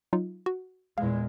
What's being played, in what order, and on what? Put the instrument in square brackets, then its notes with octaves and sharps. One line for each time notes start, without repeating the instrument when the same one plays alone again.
[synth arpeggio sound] F#3 D#4 F4
F#4
[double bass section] E2 A#2 G#3 [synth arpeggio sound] F5